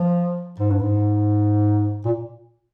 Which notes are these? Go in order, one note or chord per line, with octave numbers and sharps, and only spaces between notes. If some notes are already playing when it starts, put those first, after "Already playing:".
Already playing: F3
G#2
G2
G#2
A#2